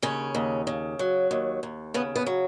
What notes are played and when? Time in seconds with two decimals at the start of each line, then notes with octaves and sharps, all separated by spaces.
0.03 D#2 C#3 C#4
0.35 D#2
0.67 C#3
0.99 F#3
1.31 D#2
1.63 D#2
1.94 C#3 B3
2.16 B3
2.26 F#3